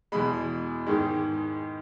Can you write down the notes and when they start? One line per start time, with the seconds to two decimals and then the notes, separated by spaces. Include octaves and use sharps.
0.12 E2 B2 G#3 B5
0.87 G#2 D#3 G#3